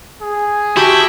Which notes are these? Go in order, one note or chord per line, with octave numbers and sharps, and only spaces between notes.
G#4
E4 F#4 G4 G5 A5